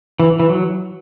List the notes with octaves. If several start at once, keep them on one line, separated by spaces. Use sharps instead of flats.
E3
E3
F#3